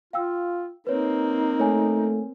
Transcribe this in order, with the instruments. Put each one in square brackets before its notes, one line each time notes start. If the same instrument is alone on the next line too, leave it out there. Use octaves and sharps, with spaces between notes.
[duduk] F4 [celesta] F5 G5 E6
[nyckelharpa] A#3 C4 [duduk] D#4 [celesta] B4 C#5
[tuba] A3 [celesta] C#5 G#5